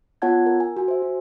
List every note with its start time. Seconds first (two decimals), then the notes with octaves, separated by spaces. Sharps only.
0.22 B3 F4 C#5 F#5 A5 G#6
0.46 A#4
0.60 G#5
0.77 F#4 G#5
0.88 C5 E5
1.02 F#4